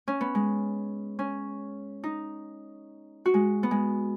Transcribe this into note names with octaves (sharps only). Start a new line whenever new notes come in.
C#4
B3
G#3
C#4
D#4
F#4
G#3
B3
G#3